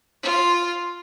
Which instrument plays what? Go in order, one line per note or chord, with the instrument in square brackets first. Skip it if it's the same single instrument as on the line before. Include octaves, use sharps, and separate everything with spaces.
[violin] F4